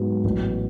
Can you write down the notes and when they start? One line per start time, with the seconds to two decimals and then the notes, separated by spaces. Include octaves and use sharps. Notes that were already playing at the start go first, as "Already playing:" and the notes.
Already playing: G#2 F#3 B3
0.24 A1 A2 F#3 B3